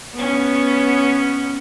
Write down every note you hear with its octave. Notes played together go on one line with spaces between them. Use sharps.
B3 C#4